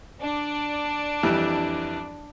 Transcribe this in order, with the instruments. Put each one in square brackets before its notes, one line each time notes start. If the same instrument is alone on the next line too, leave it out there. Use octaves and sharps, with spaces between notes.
[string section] D4
[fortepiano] F2 E3 G3